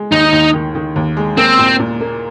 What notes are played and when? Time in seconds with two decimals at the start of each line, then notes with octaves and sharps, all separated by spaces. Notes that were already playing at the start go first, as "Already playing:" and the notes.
Already playing: G#3
0.12 D#2 D#4
0.32 D#2
0.54 D#3
0.75 D#3
0.96 D#2
1.17 G#3
1.37 A#3 C4
1.59 A#2
1.79 A#2
2.01 A#3